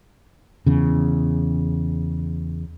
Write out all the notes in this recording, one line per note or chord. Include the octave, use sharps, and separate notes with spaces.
E2 C#3